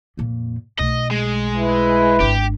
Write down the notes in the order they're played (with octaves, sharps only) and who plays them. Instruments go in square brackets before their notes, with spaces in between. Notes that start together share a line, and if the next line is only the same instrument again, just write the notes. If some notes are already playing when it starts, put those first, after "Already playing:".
[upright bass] F2 A#2
[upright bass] B1 A3 [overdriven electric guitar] D#5
[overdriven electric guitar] G#3
[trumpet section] E4 B4
[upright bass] G#1 D4 [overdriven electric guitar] G4